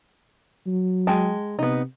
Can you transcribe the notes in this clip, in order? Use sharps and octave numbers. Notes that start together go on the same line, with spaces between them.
F#3
G#3 G5 A5
C3 B3 D#4